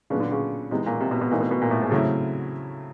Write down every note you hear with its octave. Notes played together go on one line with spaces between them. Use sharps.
A#2 C#3 F#3 B3 D4
D3
C#3
C3 E3 G#3 B3 D#4
A#2
C3
B2
B2
A#2 E3 A3 C4 D#4
B2
B2
A#2
A2
G#2
A2 C#3 F#3 A3 C4 E4